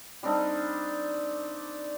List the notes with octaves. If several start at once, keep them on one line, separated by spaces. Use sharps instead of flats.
G3 C4 D4 D#4